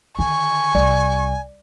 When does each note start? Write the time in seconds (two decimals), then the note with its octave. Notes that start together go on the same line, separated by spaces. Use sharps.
0.19 D3 D#3 G#5 C#6
0.75 C2 D5